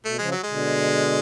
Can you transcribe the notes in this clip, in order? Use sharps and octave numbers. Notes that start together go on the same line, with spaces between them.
B2 A3
C#3 F3 G#3
F#3
G#3
B2 D3